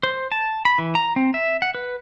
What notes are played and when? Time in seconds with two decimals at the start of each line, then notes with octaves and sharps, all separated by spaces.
0.03 C5
0.32 A5
0.65 B5
0.78 E3
0.95 A#5
1.16 C4
1.34 E5
1.62 F#5
1.75 B4